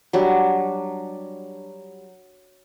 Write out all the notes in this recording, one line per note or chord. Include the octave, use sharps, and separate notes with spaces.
F#3 G3 D4